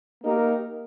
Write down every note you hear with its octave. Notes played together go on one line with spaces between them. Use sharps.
A#3 D#4 G4 A#4